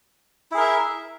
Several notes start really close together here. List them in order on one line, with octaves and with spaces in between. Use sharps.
E4 G#4 A#4 E5